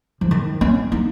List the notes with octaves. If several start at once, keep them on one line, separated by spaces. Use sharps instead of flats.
F3
D#3
C#4
D#4